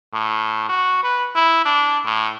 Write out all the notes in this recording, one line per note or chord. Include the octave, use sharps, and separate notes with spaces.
A2
F#4
B4
E4
D4
A2